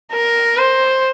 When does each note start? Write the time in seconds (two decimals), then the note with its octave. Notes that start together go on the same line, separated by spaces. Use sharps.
0.12 A#4
0.57 C5